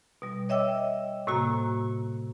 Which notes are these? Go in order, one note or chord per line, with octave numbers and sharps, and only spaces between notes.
B2 G3
C#5 D#5 E5 G5 D6 E6
A2 C3 A#3 F#4 A#5